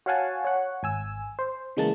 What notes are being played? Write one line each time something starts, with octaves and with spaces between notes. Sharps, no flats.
F#4 C#5 F5 F#5 G#5 A5
C#5 F#5
G#1 G#5 E6
C5
C#3 E3 G#3 A#3 A5